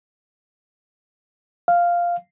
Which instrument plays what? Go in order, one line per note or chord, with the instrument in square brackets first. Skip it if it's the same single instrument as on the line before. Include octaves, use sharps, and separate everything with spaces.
[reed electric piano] F5